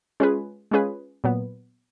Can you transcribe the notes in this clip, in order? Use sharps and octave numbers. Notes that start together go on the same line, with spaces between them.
G#3 C#4 F4 G#4 B4
G#3 C#4 F4 G#4 B4
A#2 F#3 B3